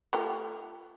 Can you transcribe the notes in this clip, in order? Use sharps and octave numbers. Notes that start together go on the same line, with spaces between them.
A3 F4 G4